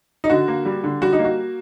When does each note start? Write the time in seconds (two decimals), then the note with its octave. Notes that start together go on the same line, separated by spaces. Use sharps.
0.24 D#4
0.30 D3 F#4
0.48 A#3
0.65 G3
0.84 D3
1.01 G3 F#4
1.13 D#4
1.19 A#3
1.25 F#4